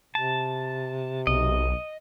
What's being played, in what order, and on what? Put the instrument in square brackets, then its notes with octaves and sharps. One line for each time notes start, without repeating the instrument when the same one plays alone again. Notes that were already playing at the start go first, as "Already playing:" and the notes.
[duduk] C3 [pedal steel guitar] A5
[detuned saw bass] B1 [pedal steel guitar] D#5